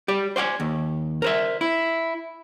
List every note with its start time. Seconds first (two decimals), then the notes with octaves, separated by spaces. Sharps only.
0.08 G4 D5
0.36 C5 D5 F#5 G#5
0.60 D#2
1.22 A#4 C5 E5
1.61 E4